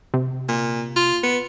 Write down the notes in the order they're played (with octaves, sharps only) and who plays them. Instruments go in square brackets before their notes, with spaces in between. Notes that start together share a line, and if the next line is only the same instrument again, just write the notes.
[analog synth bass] C3
[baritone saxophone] A#2
F4
B3